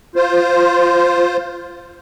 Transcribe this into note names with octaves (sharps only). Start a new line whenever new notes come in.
F4 C5